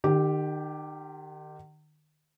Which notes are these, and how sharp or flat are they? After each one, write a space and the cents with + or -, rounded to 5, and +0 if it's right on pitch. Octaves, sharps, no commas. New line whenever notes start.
D#3 -35 G4 +0